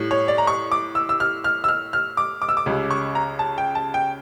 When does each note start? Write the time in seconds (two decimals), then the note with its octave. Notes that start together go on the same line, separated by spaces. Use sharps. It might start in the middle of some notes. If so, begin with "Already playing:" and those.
Already playing: A2 G3
0.11 C#5
0.28 D5
0.38 A#5
0.47 C#6
0.72 D6
0.95 E6
1.09 E6
1.20 F6
1.44 F6
1.64 E6
1.68 F6
1.93 F6
2.17 D6
2.42 D6
2.49 E6
2.57 D6
2.66 C#2 C#3 G3
2.91 C#6
3.15 A#5
3.39 A5
3.58 G5
3.75 A5
3.94 G5